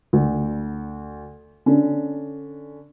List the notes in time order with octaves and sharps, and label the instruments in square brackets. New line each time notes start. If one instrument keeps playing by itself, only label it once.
[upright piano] D2
D3 C#4 D4